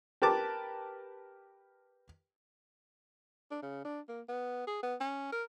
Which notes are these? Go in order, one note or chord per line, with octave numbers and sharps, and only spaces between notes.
G4 A#4 B4 A5 D6
D4
C#3
D4
A#3
B3
G#4
B3
C#4
A#4